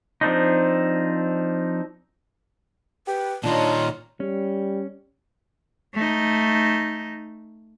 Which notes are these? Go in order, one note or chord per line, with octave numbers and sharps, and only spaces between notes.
F3 C4 D4 D#4
G4 B4
A#2 D#3 D4 D#4 F4 C#5 D#5
G3 C#4
A3 D#4